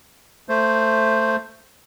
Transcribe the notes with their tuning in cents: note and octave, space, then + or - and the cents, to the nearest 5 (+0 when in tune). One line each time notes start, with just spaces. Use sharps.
A3 +15 C5 +0